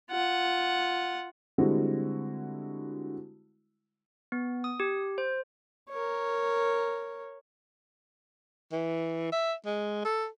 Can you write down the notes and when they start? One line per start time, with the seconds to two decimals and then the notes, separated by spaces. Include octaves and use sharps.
0.11 F4 F#5
1.58 D3 G3 G#3 C4 E4 F#4
4.32 B3
4.64 D#6
4.80 G4
5.18 C5
5.90 A#4 C#5
8.72 E3
9.32 E5
9.66 G#3
10.05 A4